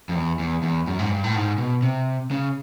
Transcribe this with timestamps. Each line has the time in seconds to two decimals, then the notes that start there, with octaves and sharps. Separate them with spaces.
0.09 F2
0.15 E2
0.39 E2
0.63 E2
0.87 F#2
0.99 G#2
1.10 G2
1.24 A2
1.35 G#2
1.58 B2
1.83 C3
2.31 C#3